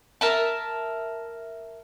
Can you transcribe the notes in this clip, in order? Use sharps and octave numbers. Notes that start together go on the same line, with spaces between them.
A#4 E5 A5